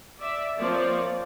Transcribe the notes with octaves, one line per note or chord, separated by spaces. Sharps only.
D5 E5
F3 A#3 C4 C#5 D5